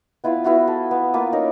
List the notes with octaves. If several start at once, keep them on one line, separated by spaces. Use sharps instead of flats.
B3 E4 F4 F5
B3 E4 F#4 F5
A4
B3
A#3 F4 B4
C#4 D#4 A#4